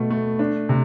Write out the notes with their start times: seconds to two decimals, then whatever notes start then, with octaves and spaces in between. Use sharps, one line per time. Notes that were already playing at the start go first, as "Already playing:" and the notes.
Already playing: B2 A3
0.10 A3
0.39 D4
0.69 C3